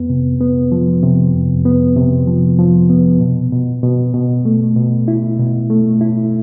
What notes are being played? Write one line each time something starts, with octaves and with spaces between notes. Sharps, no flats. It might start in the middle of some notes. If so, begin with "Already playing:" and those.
Already playing: F2 B3
C3
B3
F3
C3
F2
B3
C3
F3
F3
B3
B2
B2
B2
B2
A3
B2
E4
B2
A3
E4